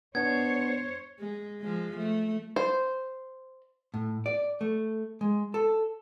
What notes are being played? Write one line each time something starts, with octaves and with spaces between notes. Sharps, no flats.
B3 D4 C5 C#5 G#6
G#3
F3 G#3
A3
C5
A2
D5
A3
G#3
A4